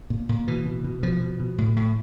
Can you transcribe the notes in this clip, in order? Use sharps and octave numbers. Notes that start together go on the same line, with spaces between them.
A#2
A#2
B2 E3
B2
B2
B2 F3
B2
B2
A2
A2